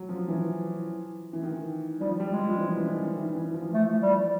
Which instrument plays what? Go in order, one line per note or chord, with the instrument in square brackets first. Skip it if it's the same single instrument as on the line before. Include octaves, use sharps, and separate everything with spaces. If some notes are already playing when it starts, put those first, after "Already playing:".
Already playing: [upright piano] F#3
F3
E3
E3
D#3
[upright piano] F3 [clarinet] G3
[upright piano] G3
[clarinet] G#3
[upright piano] F3
F3
E3
E3
D#3
E3
E3
F3
[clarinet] A3
[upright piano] F3 [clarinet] G3